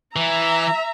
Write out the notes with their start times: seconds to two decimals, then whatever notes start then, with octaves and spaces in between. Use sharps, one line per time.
0.16 E3 E5 A#5